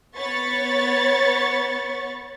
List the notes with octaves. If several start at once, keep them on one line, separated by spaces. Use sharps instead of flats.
B3 C#5 B5 C#6 A6